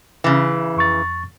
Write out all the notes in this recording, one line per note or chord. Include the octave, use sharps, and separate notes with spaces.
C#3 E3
F2 C#6 A6